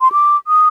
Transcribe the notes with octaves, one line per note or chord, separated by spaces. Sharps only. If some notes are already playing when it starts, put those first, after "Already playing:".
C6
D6
D#6